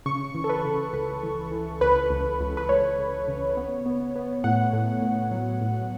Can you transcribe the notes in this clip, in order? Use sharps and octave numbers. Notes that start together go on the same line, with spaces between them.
C#3 C#6
E3
A4
B4
C#3
C#2 B4
E3
E3
C#2 B4
C#2
C#2
B4
C#2 C#5
C#2
C#3
B3
B3
B3
A2 F#5
A2
A2
F#3
A2